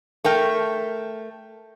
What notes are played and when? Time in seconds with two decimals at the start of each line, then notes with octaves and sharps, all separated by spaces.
0.24 A3 A#4 G5